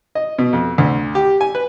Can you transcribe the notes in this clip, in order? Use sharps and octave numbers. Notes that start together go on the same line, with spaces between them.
D#5
B2
F2
D2
G4
G#5
B4